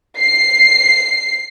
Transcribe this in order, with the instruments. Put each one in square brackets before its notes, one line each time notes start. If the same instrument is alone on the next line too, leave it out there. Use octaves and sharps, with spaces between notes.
[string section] C7